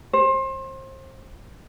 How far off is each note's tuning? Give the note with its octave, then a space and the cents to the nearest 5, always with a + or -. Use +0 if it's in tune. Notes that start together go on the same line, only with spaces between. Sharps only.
C5 +30